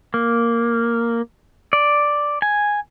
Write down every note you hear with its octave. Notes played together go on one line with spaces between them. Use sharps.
A#3
D5
G#5